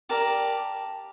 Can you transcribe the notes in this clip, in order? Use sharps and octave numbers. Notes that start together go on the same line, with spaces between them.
G4 A#4 D5 A5